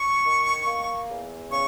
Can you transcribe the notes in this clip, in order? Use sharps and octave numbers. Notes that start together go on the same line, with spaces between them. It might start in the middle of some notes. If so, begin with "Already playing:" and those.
Already playing: C#6
D#3
A#3
E2
C#3 C#6